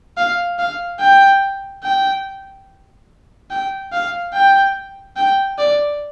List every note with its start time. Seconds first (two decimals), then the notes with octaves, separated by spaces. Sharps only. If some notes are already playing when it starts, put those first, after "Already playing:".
0.17 F5
0.59 F5
1.00 G5
1.84 G5
3.51 G5
3.92 F5
4.33 G5
5.17 G5
5.58 D5